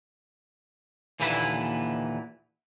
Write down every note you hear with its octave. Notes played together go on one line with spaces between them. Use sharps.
D#2 A#2 D3 E3 E4 B4